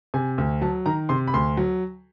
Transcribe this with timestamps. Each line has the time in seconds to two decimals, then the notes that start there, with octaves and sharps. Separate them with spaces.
0.14 C3 G#5
0.38 D2
0.61 F#3 A5
0.86 D#3 A#5
1.09 C3 C6
1.28 B5
1.34 D2 C6
1.57 F#3